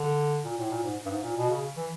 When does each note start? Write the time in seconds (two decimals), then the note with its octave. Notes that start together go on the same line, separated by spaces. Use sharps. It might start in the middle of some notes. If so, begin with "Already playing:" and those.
Already playing: D3
0.44 A#2
0.58 A2
0.70 A#2
0.84 G#2
1.06 G2
1.11 G#2
1.23 A#2
1.37 B2
1.49 C#3
1.77 E3